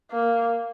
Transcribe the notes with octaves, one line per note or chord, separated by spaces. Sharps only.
A#3